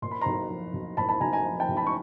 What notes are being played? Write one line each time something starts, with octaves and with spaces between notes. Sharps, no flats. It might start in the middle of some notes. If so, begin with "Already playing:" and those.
A#2 C6
B5
B1 A#5 C6
F3
B1
A#2 A5 B5
A5 B5
B1 G#5 A#5
G#5 A#5
F3
G5 A5
B1
A5 B5
C#6